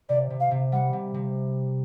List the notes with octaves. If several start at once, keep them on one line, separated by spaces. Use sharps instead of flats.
C3 D5
C3
F5
C3
G3 F#5
C3
C3